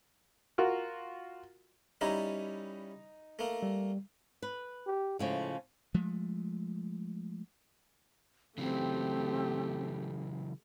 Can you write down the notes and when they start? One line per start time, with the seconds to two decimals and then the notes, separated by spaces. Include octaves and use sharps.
0.58 F4 F#4 A#4
2.01 G3 C#4 D#4 E4 A#5
3.39 A3 A#3
3.63 G3
4.42 B4
4.87 G4
5.19 A2 C#3 F3 G#3
5.94 F3 G#3 A3
8.58 C#3 E3 F#3 A3 C4 G4